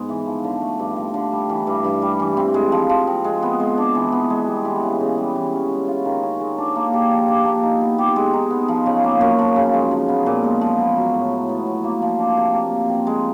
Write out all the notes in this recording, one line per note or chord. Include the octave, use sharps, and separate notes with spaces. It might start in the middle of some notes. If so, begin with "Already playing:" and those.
Already playing: G#2 G#3 B3
E3
F3
D3
A3
G2
F3
D3
G3
E3
G2
G2
G3
E3
C4
G#3
F3
F3
C4
G#3
B3
G#3
D4
E3
B3
G#3
G3
E3
C#3
C#3
G3
E3
C#4
G#3
F4
D#3
C#4
G#3
D4
A#3
G4
F3
D4
A#3
D#4
B3
G4
G#3
D#4
B3
F3
C#3
A#3
F#2
F3
C#3
G#3
F3
B3
A#2
G#3
F3
B3
F#3
A2
A2
B3
F#3
A#3
F3
D4
C3
A#3
F3
C4
G#3